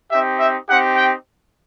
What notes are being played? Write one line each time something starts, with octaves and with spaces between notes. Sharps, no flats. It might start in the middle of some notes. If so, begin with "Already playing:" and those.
C4 D#4 G4 E5
E5
C4 D#4 G4 F#5
G5